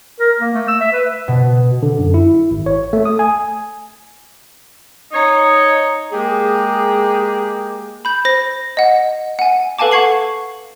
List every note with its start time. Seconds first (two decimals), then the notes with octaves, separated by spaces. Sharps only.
0.20 A#4
0.40 A#3
0.54 A3
0.68 E6
0.81 E5
0.93 B4
1.28 B2
1.83 D3
1.99 F#2
2.14 E4
2.51 G#1
2.66 C#5
2.93 A3
3.05 D#6
3.19 G#5
5.12 D#4 C#5
6.12 G#3 A#3 G4 G#4
8.05 B5 G6
8.25 C5 A#6
8.77 D#5 F#5
9.39 F#5 G#5
9.79 A4 B4 F5 G#5 A5 D6
9.91 F#5 C#6 G#6 C7 F#7